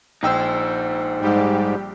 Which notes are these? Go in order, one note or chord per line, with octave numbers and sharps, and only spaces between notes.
A#1 D#4 C5 G5 E6
G#2 G3 G4